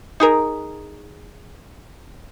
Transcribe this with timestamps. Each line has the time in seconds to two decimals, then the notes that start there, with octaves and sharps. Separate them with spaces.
0.20 D#4 G#4 A#4